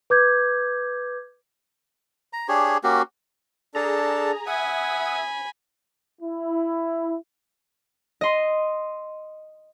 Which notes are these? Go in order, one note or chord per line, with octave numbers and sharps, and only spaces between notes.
B4 D6 G6 G#6
A#5
D4 G4 G#4 C#5
A#3 C#4 F#4 G4
D4 G#4 A4 A5 A#5
E5 F#5 G#5 B5 D#6 G#6
E4
D#5 C6